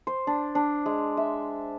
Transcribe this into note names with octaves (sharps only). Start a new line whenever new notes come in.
C5
D4
D4
G#3
E5